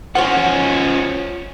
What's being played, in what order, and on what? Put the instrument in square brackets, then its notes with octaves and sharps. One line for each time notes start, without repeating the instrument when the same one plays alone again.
[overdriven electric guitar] F3 C#4 [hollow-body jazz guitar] F#4 C5 F#5